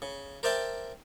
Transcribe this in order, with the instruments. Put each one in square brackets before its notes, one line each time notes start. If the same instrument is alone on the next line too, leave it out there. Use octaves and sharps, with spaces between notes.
[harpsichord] C#3
A#4 C5 D5 E5 G5 A5